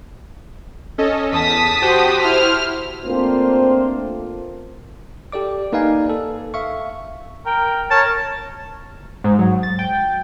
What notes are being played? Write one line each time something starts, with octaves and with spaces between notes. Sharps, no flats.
C#4 A4 D#5
E2 A5 D#6 B6
F#4 G4 C5
E4 C5 F6
A3 A#3 C4 D4 F4 C5
G4 A4 D5 D6
A#3 D#4 B4 D5 F5 G#5
A4
E5 F5 C#6
A#4 G5
A#4 C#5 A5
G#2
F#3
A6
G5